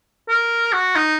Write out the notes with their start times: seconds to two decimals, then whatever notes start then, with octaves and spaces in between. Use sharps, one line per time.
0.29 A#4
0.73 F#4
0.95 D#4